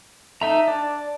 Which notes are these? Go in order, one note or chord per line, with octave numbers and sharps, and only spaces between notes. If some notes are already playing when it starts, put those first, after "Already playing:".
A3 D#4 E5 A#5
D4 D5